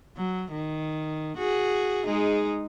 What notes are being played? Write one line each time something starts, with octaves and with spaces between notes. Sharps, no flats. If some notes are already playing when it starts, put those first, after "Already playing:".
F#3
D#3
F#4 G#4
G#3 D#4 G#4